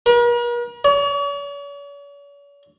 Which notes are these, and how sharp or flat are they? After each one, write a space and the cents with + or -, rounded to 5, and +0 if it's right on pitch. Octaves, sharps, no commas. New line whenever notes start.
A#4 +45
C#5 +45